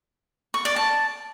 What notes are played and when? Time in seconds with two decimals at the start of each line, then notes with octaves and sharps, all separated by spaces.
0.54 C#6
0.65 D5
0.76 A5